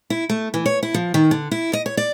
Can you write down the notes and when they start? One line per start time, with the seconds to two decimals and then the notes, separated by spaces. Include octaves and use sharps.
0.10 E4
0.30 A3
0.54 E3
0.66 C#5
0.83 E4
0.94 F3
1.14 D#3
1.31 D3
1.51 E4
1.73 D#5
1.86 C#5
1.97 D5